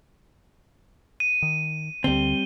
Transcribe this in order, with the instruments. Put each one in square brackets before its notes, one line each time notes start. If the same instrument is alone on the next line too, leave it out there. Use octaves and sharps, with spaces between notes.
[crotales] D#7
[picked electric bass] D#3
[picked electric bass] D2 D3 [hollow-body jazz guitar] G3 C4 [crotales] G7